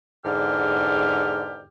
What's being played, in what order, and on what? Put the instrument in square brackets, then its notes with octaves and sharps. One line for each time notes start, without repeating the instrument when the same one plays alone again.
[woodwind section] E2 G#2 D3 G4 F6